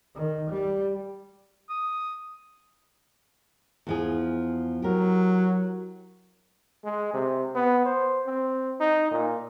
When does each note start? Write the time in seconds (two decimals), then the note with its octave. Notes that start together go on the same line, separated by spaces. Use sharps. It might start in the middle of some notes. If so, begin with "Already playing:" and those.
0.15 D#3
0.50 G3
1.70 D#6
3.87 E2 F3 G#4
4.82 F#3 G4 A#4
6.84 G#3
7.14 C3
7.55 B3
7.86 C5
8.26 C4
8.81 D#4
9.11 A#2